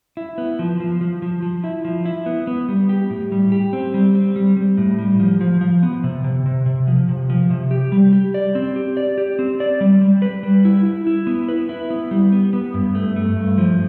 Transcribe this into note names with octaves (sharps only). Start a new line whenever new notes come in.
E4
B3
F3
F3
F3
F3
F3
E4
F3
E4
B3
B3
G3
G4
A2
G3
G4
C4
G3
C4
G3
G3
A2
G3
F3
F3
F3
B3
C3
C3
C3
C3
F3
C3
F3
C3
G4
G3
G4
D5
C4
G4
D5
G4
C4
D5
G3
G3
B4
G3
E4
E4
E4
B3
B4
E4
B3
G3
B3
B3
G2
A3
A3
G2
F3